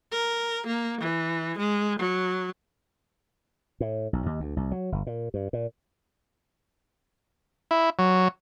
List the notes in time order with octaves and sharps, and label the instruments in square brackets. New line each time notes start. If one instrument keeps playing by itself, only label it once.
[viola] A#4
A#3
E3
G#3
F#3
[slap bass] A2
B1
D#2
D2
C2
F#3
G1
A#2
G2
A#2
[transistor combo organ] E4
F#3